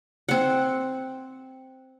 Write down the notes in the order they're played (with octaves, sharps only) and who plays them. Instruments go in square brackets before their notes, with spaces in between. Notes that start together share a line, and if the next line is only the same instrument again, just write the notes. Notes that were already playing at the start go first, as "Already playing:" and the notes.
[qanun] C4 F#5